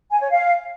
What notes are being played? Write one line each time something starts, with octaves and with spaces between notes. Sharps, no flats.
G#5
C#5
F5